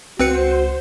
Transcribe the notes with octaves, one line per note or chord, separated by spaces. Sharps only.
C#2 C4 F#4 B4 C5 C#7